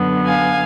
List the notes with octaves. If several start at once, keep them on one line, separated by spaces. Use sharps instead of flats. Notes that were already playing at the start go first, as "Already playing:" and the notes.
Already playing: F#2 D3 F#3 B3
F5 G#5